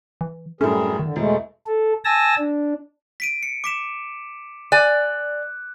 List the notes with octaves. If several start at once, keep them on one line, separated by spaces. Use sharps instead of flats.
E3
F#2 A2 G3 A3 C#4 G#4 A#4
D3 D#3
E1 G#3 A3
A4
G#5 A5 E6 A#6
D4
B6 D7 D#7
C#7
D6 B6 E7
D5 G#5 F#6